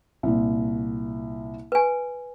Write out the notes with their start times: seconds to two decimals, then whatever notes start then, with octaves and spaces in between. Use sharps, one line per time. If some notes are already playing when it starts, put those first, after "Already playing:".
0.23 C2 A#2 A#3
1.72 B4 G#5